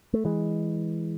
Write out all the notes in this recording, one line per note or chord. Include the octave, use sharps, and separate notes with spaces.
A3
E3 G#3